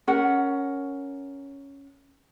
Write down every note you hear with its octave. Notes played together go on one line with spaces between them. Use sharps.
C#4 A#4 F#5